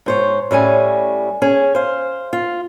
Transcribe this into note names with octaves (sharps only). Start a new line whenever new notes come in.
G#2 C5 C#5
A2 G3 C#4 G#5
C#4 G#4
C5 F5
F4